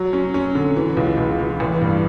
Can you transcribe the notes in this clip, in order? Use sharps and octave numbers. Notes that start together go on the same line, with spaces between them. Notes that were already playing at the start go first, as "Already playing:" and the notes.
Already playing: F#3
C#4
C#4
D3
E3
C#2
C#2
E3
A1
G2